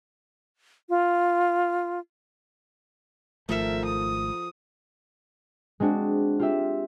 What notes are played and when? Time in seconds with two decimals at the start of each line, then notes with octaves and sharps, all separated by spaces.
0.89 F4
3.49 G#1 F3 A3 A4 A#4 E5
3.85 D#6
5.80 G#3 C4 D4 F#4
6.39 F4 G4 E5